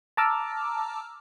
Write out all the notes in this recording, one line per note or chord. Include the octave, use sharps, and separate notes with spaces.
A5 A#5 D6 E6 F6